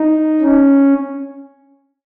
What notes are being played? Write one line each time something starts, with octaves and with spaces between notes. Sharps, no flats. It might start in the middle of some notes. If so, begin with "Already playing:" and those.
Already playing: D#4
C#4